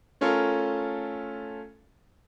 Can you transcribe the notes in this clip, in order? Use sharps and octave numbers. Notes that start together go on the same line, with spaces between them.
A3 C#4 F4 A4 A#4